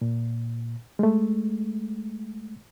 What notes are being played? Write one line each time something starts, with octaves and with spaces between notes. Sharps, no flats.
A#2
G#3 A3